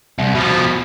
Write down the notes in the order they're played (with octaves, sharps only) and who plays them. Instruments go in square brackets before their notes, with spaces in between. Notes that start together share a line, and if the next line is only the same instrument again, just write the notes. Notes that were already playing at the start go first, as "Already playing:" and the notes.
[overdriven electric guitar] C2
B2 F3